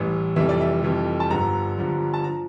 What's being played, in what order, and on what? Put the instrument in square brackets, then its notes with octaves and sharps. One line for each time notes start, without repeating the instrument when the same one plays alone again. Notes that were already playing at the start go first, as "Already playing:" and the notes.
Already playing: [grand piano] A1 A2 E3 G3
F1 F2 E3 G3 E5
D5
E5
F1 F2 E3 G3
A5
G1 G2 D3 F3 A#5
G1 G2 D3 F3
A5
F3 A#5